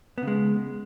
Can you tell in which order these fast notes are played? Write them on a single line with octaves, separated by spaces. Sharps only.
B3 C#3 G#3